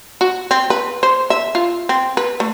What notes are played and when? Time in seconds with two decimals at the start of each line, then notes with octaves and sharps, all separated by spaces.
0.21 F#4
0.51 C4
0.70 B4
1.03 C5
1.30 E5
1.55 F4
1.89 C4
2.17 B4
2.40 A3